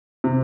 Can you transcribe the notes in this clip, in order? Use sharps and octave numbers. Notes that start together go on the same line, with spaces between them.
C3